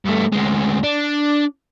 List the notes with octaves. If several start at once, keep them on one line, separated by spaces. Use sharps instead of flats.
G2 A3
D2 G#3
D4